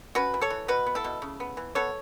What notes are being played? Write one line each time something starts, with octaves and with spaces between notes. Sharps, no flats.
C#4 F#4 B4
E3
A4 C#5
E3
B2 F#4 B4
B3
E4 A4
B2
C#3
B3
E3
B3 A4 C#5